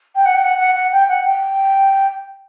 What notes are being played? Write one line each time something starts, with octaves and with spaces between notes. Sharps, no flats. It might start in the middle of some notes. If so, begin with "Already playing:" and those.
G5
F#5
G5
F#5
F#5
F#5
G5
F#5
G5